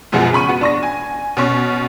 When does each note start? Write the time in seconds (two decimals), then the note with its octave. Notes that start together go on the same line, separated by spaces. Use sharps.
0.12 F#2 B2 F3 G#3 B3 G#4
0.33 C#3 B5 C#6 D#7
0.48 B3 F#4
0.61 D4 C#6 A#6
0.83 G#5
1.37 B2 C#4 C#6